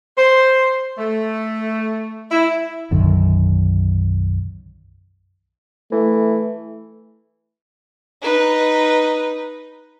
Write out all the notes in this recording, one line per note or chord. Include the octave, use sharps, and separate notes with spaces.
C5
A3
E4
B1 F#2 D3 D#3
E3 A3
D#4 B4